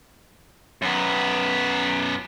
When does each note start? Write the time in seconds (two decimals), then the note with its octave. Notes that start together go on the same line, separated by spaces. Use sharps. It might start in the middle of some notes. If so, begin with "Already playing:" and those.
0.82 F#2 B3